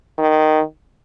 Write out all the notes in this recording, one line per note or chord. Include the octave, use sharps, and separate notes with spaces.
D#3